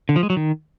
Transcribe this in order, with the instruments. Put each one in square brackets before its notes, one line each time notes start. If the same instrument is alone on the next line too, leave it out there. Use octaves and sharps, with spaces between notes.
[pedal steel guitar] D3
F3
G#3
F#3
D#3